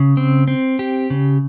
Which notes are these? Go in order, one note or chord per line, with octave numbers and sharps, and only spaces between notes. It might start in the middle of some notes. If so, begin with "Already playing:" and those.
Already playing: C#3
C4
C4
G4
C#3